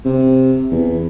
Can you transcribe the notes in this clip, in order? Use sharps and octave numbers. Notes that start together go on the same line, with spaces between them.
C3
E2